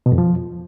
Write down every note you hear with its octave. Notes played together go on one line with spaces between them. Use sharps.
B2
F2
F3